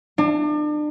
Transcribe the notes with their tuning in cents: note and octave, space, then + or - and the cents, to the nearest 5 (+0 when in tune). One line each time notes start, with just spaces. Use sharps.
D4 +35